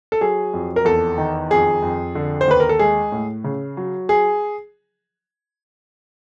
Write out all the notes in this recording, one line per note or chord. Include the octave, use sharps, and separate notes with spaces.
A4
F#3 G#4
F2
A#4
E2 A4
D#3
F2 G#4
F2
D3
C5
D#2 B4
A#4
A4
G#3 G#4
A2
C#3
F#3
G#4